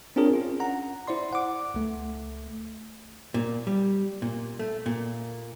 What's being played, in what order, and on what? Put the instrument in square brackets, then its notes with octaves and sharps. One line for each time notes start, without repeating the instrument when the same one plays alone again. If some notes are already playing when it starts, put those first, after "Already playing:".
[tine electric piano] C4 D4 F4 G#4 A#4 C#5
C#4 F4
F#5 A#5
E4 C5 D5 C6
F#5 D6
C#2 A3
[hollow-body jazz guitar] A#2
G3
A#2
A3
A#2